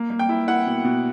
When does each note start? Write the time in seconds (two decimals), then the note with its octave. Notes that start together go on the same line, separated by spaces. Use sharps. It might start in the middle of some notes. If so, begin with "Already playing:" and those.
Already playing: A#3
0.10 A#3
0.19 G5
0.29 E4
0.48 E4 F#5
0.67 B2
0.84 B2